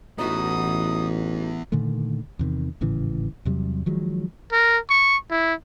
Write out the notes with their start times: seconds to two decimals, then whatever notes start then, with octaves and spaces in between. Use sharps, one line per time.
0.18 A1 E3 B3 D#4 F#4 D#6
1.72 A#2 D3 D#3 A3
2.39 E2 C3 D#3
2.81 G#1 A2 C#3 E3
3.45 E2 C3 F#3 G3
3.86 D#3 F3 F#3 G#3
4.52 A#4
4.89 C#6
5.30 E4